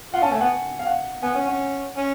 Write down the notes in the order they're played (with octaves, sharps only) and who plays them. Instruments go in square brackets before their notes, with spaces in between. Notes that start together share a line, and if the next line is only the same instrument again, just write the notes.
[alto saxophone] F4 [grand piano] F#5
[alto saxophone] C#4 [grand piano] A5
[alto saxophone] A3 [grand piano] G#5
[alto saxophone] B3 [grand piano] F#5
[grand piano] F5
F#5
[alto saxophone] B3 [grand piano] G#5
[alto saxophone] C#4 [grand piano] F#5
[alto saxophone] C#4 [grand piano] F#5
[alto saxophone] C#4